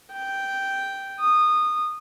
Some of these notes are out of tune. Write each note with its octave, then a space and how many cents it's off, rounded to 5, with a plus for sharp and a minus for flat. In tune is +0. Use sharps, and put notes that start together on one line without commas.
G5 -5
D#6 -20